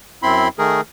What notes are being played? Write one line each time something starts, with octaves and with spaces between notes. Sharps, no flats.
F#2 C4 E4 B5 C6
D#3 A3 G#4 A#4